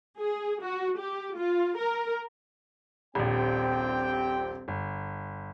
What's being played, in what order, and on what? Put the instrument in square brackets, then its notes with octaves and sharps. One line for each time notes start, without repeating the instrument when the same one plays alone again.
[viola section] G#4
F#4
G4
F4
A#4
[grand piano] D#1 A#1 [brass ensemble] C4 G4 G5
[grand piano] G1